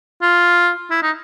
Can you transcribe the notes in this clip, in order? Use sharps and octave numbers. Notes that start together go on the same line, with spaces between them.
F4
E4
D#4